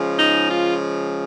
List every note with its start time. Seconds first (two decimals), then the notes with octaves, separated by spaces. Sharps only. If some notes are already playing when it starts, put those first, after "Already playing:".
Already playing: C#3 F3 G#3
0.18 D#4
0.49 F4